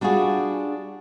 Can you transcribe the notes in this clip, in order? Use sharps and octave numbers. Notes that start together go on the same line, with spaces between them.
G3 D4 F4 F#4 G#4